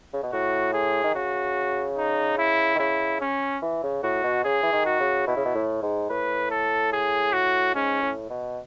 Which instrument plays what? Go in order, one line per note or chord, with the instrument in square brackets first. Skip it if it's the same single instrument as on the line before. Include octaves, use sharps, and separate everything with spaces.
[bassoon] C#3
B2
[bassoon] A2 [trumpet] F#4
[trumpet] G#4
[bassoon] D#3
[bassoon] C#3 [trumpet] F#4
[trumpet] D#4
E4
[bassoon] D#3
[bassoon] C#3 [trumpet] E4
[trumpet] C#4
[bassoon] E3
C#3
[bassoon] A2 [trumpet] F#4
[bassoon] B2
[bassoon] C#3 [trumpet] G#4
[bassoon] E3
D#3
[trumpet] F#4
[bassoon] C#3
[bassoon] B2 [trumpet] E4
[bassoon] C#3
B2
A2
G#2
[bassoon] A2 [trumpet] B4
[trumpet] A4
G#4
F#4
[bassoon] G#2 [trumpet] C#4
[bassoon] A2
B2